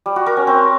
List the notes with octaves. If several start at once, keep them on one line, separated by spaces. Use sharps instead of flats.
G3
F#4
A#4
C#4
C4